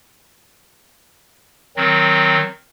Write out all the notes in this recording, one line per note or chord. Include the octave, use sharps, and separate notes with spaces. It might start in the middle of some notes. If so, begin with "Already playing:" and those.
D#3 F#3 C4